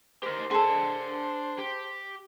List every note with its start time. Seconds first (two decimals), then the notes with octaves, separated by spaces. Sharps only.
0.23 G4 A#4 C5
0.51 D4 G#4 A4 C6
1.58 G4